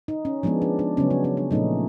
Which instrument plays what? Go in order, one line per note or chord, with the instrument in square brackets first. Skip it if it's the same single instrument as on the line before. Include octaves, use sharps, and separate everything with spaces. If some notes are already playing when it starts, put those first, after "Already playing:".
[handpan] D#4
C#4
F3 G#3 B3 D4
D4
D4
C#3 F#3 B3 C#4
D4
C#4
D4
A#2 F3 A3 C#4 D#4